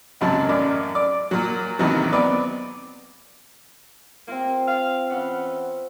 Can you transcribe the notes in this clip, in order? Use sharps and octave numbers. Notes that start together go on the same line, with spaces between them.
G#1 C#2 F#2 C3 F#3 A5
A1 F#2 D5
D5
A#2 F#3
A1 D#2 C3 D#3 E3 F#3
B3 C4 D5
A#3 C4 F4
F5
E3 B3 C#4 F#5